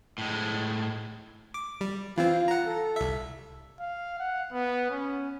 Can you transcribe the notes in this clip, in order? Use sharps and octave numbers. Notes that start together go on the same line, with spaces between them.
A2 G#3
D6
G3
E3 C4 F4
F#5 A#5
A4
C2 E5
F5
F#5
B3
C#4